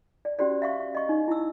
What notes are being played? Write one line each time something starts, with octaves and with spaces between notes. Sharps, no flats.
D5
C#4 F#4 G4 C5 D5
E5 F5 C#6
D#5 C#6
D#4
E4 E6